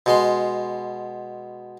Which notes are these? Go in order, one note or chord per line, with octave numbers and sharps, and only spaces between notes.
B2 G#3 C6